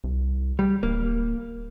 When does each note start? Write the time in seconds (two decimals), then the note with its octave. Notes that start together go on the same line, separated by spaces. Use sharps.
0.04 C2
0.59 G3
0.83 D1 A#3